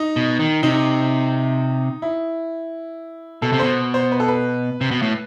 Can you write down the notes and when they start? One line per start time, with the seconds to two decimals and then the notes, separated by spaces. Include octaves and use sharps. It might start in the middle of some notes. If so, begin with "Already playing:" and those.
Already playing: D#4
0.16 B2
0.39 D#3
0.63 C3 D#4
2.02 E4
3.42 B2 A4
3.52 C3
3.59 B2 C5
3.94 C5
4.12 B4
4.20 A4
4.28 B4
4.81 C3
4.91 B2
5.02 A2